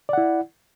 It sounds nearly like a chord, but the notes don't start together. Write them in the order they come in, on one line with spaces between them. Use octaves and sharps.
D5 F#5 E4